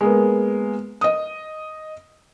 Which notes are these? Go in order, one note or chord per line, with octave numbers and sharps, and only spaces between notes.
G#3 A#3 B3
D#5 D#6